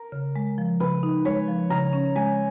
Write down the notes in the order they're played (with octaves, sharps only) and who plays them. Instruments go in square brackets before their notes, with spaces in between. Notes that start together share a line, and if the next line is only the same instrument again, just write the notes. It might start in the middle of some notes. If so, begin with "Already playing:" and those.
Already playing: [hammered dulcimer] A#4
[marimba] C#3
G#3
F3
[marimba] C#3 [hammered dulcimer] B4
[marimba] D#4
[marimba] G#3 [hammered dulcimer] C#5
[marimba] F3
[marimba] C#3 [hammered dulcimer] A#5
[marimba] C#4
[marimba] G#3 [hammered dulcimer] G#5